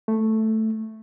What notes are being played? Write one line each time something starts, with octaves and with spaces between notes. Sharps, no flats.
A3